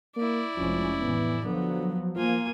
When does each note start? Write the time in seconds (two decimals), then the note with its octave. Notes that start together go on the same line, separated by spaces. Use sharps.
0.16 A#3 E4 D5
0.57 F1 F3 G#3 C#4
1.01 A2 E3 B3
1.44 D3 F3 F#3 B3
2.15 F3 A#3 F4 G#5